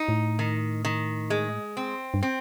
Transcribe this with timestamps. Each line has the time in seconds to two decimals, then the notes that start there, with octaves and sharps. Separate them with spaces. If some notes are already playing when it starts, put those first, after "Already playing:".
Already playing: D#4
0.08 A2
0.39 D#3
0.85 D#3
1.30 G#3
1.77 C4
2.14 G2
2.23 C4